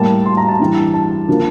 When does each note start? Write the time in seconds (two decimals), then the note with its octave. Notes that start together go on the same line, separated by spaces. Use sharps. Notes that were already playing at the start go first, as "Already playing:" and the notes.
Already playing: A2 G3 A#3 A5
0.26 C6
0.37 A#5
0.48 A5
0.60 G2 E3 G3
0.94 A5
1.28 D3 F3 A#3